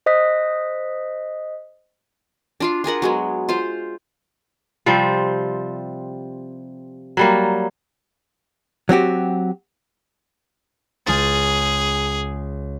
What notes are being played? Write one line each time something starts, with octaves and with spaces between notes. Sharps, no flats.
C5 D#5 D#6 F#6 B6
D4 F4 F5
F4 G#4 A#4 F#5
F#3 G#3 B3
F4 C5 F5
C3 F3 G3 C4
F#3 G3 A#3
F#3 C4 F#4 G4
C#2 C#4 G#4 A6